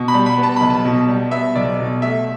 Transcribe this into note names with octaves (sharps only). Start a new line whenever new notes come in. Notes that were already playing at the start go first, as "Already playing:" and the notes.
Already playing: B2
B5
G3
B5
B3
A5
B1 B5
A5
B2
G3
B3 E5
B1 D5
B2
A3 E5